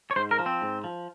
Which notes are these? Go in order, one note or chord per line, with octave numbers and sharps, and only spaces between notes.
C#5
G#2 C5
A#4
F3
C4
G#2
F3